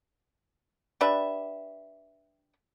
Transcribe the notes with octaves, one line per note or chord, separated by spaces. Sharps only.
D4 G4 B4 E5